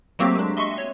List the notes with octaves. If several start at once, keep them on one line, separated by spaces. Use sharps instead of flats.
F#3 A3 A#3 C4 F#4 G4
G#3 D4
D#5 E5 C6 C#6
C#5